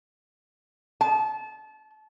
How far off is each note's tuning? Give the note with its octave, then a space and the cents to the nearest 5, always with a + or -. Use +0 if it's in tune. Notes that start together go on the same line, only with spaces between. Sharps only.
A5 -30